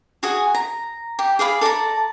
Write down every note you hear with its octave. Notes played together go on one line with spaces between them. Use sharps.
F#4 G#4 G#5
A#5
G4
G#4 D5 F5 B5
A4 D5 A5 A#5